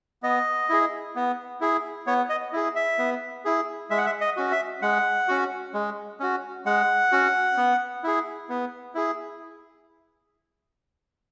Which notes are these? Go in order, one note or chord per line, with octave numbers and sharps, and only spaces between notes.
B3 D#5
E4 G#4
B3
E4 G#4
B3 C#5
D#5
E4 G#4
E5
B3
E4 G#4
G#3 E5
F#5
E5
D#5
C#4 F#4
E5
G#3 F#5
C#4 F#4
G#3
C#4 F#4
G#3 F#5
C#4 F#4
B3
E4 G#4
B3
E4 G#4